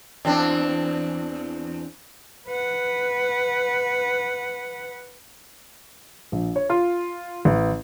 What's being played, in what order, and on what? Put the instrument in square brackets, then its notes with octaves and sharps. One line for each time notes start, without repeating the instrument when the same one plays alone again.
[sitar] E2 C4 D4
[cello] B4 F#5
[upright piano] A#1
C#5
F4
A1